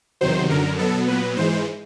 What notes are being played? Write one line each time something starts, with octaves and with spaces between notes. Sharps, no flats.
E2 C3 D#3 F#3 C5
F#2 D3 F#3 A#4
B2 F#3 B3 A4
A#2 F#3 B3 B4
G#2 E3 G#3 C5